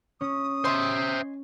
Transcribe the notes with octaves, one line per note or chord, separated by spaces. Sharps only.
C#4 D#6
C5 D#5 E5 G#5 C6